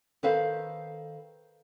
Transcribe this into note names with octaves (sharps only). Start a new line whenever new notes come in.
D#3 A4 B4 C5 F5